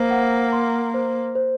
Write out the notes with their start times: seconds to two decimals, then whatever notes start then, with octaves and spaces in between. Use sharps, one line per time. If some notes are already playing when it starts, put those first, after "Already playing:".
Already playing: A#3 C5
0.11 F#5
0.52 C6
0.94 C5
1.35 C5